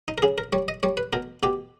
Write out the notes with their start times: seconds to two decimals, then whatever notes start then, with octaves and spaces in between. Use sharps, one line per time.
0.08 D#4
0.18 A#4
0.22 C#3 G#4
0.38 A#4
0.53 G3 C#5
0.68 D#5
0.83 G3 C#5
0.97 B4
1.13 B2 A#4
1.43 B2 G4